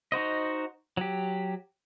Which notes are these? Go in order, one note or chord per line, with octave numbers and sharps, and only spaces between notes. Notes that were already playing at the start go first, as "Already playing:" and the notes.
D#4 F#4 C5 D#5
F#3 G4